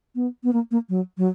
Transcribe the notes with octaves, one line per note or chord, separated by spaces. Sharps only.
B3
B3
A#3
A#3
F#3
F#3